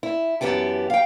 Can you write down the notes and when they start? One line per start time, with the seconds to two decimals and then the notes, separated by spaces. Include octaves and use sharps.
0.03 E4
0.41 F#2 E3 B3 G4 A5
0.90 F5 G5